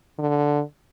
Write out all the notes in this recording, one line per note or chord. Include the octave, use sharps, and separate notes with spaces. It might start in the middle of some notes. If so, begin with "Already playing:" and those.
D3